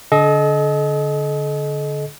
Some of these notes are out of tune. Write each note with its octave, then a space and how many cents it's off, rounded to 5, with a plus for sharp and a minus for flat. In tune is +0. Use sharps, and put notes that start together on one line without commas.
D3 -20 A4 -40 D#5 +0